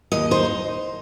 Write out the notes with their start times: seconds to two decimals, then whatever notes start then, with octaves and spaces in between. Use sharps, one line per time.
0.12 D#2 D#5
0.31 D#4 C5